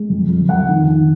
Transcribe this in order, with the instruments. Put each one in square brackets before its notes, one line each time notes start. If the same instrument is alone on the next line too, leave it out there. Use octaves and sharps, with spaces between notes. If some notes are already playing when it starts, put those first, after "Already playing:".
Already playing: [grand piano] G#3
F2
F2
F2 F#5
D#3
D#3